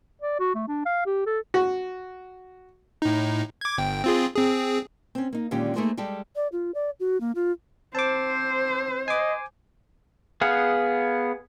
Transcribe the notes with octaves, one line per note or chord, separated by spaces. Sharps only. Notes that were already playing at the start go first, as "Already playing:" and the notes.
D5
F#4
A3
D4
F5
G4
A4
F#4
A2 D#4
D6 G#6
G1 G5
C4 F4 G#4
C4 G#4
C4 C#4
A#3 D#4
A#2 D3 D#3 G#3 C#4 G4
A3 A#3 D#4 G#4 A#4 C5
G3 G#3 G4 A4
D5
F4
D5
F#4
A#3
F4
C4 C5 A5 D6
D#5 G#5 D6
B3 G#4 F5 F#5